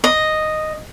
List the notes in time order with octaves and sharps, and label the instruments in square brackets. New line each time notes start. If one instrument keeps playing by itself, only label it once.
[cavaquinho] D#5